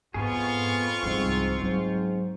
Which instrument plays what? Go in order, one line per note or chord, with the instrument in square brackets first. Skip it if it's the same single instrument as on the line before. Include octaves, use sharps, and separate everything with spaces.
[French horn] F2 [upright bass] G#2 [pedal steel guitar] B3 G#4 [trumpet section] F4 C#6
[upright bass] C2 F3 [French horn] G#2 [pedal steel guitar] C4
[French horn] G#2 [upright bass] F#3